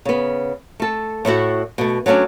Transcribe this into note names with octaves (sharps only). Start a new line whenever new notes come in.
C#3 B3
A3 A4
A2 A3 E4 F#4
B2 A3
F#3 A3 A#3 C#4 D4